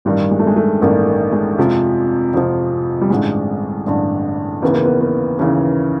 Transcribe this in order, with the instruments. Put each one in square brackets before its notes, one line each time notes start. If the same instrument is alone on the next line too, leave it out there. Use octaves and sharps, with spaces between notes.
[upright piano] A1 G2 D#3 [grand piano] G3
[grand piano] G#3
A3
G#3
A3
[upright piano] A1 G2 D#3 [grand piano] A#3
[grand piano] A#3
G#3
[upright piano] F2 C3 F3
F2 C3 F3
[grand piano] G3
[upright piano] A1 G2 D3 [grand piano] G#3
[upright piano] A1 G2 D3
[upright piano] D#2 C#3 E3 [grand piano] B3
[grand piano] A#3
B3
B3
[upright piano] D#2 C#3 E3 [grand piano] C#4